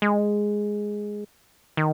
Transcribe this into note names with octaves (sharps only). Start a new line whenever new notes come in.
G#3
D#3